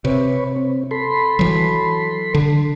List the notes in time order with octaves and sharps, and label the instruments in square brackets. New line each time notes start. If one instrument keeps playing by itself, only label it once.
[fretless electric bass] C3 [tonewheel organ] B4 C#5
[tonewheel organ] C4
A4 B5 C6
[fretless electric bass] E3 F#3
D3